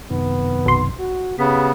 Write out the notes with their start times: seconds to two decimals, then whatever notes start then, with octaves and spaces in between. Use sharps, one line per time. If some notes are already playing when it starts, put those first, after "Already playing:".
0.11 F#2 C3 D#3 B3
0.66 B1 C6
0.99 F#4
1.39 C#3 B3 G4 B5